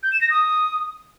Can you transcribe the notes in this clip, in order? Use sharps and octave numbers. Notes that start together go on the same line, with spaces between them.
G6
E7
A#6
D#6